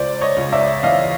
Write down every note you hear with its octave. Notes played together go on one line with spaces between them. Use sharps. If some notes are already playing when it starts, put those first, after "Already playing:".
Already playing: C#2 C5 D5
C#5 D#5
C#2
D5 E5
E3 D#5 F5